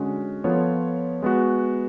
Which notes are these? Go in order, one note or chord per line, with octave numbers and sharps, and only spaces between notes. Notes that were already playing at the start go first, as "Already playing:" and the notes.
Already playing: D3 G#3 C#4 F#4
F3 B3 F4 A4 C#5
G#3 B3 F#4